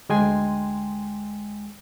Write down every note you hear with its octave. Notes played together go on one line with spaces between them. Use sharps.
D2 G#3 G5 G#5 C6